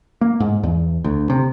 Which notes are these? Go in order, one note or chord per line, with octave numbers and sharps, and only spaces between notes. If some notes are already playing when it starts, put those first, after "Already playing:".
A#3
G#2
E2
D2
C3